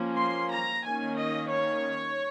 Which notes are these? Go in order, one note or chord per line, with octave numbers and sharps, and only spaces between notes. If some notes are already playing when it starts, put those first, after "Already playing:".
Already playing: F3 A#3 C#4
C6
A#5
D#3 A#3 C#4 G#5
D#5
C#5